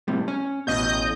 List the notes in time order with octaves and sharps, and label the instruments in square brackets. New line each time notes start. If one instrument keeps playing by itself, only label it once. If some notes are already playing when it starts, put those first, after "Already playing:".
[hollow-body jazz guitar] A2 C3 G3
C#4
[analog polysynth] A1 D#5 G6 [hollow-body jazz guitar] B2